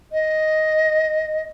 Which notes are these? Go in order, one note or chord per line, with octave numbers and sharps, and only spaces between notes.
D#5